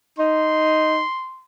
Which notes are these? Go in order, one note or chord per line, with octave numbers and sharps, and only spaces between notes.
D#4 C6